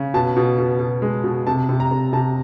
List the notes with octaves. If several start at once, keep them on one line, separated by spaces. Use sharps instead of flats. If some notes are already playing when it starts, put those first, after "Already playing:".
Already playing: C#3
B2 A5
B2
B2
B2
G#3
B2
C3 A5
C3
A#5
C3
C3 A5